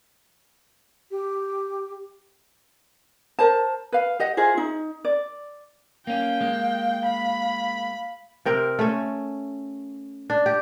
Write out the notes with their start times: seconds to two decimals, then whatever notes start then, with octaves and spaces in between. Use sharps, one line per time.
1.11 G4
3.39 A#4 C5 A5
3.92 B4 F5
4.19 G4 D#5 F#5
4.37 E4 F4 G#4 C5
4.57 D#4
5.05 D5
6.07 A#3 C#4 F5 G5
6.40 G#3 A#3
7.06 B5
8.45 C3 C4 A#4
8.79 A3 C#4
10.30 D4
10.46 G4